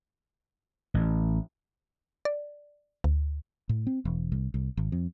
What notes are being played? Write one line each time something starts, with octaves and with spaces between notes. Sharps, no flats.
A1
D5
D2
A2
C4
E1
C2
C2
G#1
F2